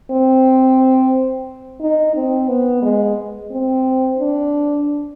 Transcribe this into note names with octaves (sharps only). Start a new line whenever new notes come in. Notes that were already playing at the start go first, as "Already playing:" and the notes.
C4
D#4
C4
B3
G#3
C4
D4